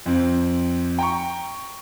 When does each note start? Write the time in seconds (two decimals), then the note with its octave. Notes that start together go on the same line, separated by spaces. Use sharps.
0.06 F2 C4
0.99 G5 A#5 C#6